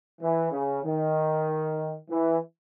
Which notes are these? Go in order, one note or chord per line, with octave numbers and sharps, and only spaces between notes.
E3
C#3
D#3
E3